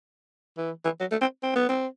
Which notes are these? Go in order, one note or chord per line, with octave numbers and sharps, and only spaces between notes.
E3
E3
F#3
A3
C4
C4
B3
C4